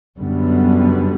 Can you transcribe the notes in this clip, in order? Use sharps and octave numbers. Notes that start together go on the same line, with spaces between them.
F#2 D3 G3 B3